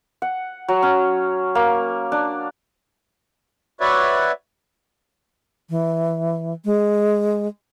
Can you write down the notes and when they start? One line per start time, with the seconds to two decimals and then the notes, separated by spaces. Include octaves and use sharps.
0.22 F#5
0.68 F#3
0.83 C#4
1.55 A#3
2.12 D4
3.81 F#4 B4 C#5 D5 E5
5.70 E3
6.65 G#3